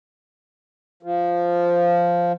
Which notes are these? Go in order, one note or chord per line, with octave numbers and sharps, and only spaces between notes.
F3